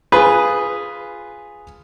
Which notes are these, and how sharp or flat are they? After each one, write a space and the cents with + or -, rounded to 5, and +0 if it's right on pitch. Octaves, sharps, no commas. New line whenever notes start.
F4 -5 G#4 -5 B4 +0